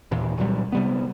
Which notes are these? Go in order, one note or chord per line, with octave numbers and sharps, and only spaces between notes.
D#2 A#2 E3
C2 A#2 F#3 G3
C3 G3 B3